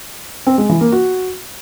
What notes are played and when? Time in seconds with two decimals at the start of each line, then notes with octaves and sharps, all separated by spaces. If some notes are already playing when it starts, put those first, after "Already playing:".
0.47 C4
0.58 G#3
0.69 E3
0.81 A#3
0.92 F#4